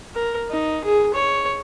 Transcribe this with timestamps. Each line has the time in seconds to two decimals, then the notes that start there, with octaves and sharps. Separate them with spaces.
0.15 A#4
0.50 D#4
0.84 G#4
1.14 C#5